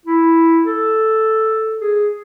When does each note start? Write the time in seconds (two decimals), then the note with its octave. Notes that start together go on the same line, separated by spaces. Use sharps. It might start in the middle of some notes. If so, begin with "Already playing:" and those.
0.06 E4
0.64 A4
1.80 G#4